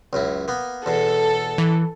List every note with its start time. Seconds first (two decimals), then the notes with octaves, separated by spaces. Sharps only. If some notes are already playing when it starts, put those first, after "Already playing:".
0.13 C#2 F#2 E4
0.48 A#3 B3
0.86 E2 B2 A4
1.58 E3